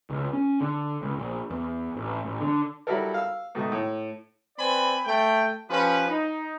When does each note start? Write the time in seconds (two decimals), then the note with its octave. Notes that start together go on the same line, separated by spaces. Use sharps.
0.10 C#2
0.33 C#4
0.61 D3
1.02 C#2
1.17 A#1
1.51 E2
1.96 A1
2.26 A1
2.40 D3
2.87 F#3 G3 E4 F#4 A4 A#4
3.14 F5 E6
3.55 G#2 B2 D#3 A3
3.72 A2
4.58 C4 B4 D5 G#5 B5
5.05 A3 G5
5.70 F3 C#4 G4 B4
6.09 D#4